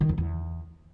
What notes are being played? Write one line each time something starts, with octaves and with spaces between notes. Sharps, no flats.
D#3
F2
E2